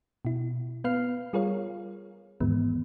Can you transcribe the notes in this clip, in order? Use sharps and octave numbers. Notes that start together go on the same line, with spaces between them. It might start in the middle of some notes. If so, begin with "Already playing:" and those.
B2 E4
B3 B4 F5 F6 C7
G3 F4 G#4 A#4 C#5 F5
E2 G#2 D#3 E3 G#3 B3